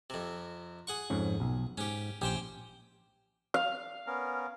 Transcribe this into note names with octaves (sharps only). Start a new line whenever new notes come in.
F2 C3
G#4 F#5 C#6
F2 G#2 C#4
B1
G#2 C#4 G4
A#1 C#4 G4 C5 G5
F5
B3 C#4 A#4